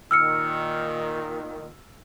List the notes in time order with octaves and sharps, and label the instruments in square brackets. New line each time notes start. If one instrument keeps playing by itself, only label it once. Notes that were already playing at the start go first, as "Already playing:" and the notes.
[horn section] A#2 D#3 [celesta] E6 F6 C#7